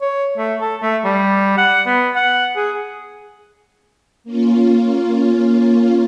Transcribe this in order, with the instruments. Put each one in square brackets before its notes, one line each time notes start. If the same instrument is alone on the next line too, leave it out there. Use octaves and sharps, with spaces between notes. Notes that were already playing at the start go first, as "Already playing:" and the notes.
[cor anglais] C#5
A3
A4
A3
G3
F#5
B3
F#5
G#4
[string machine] A#3 C#4 F4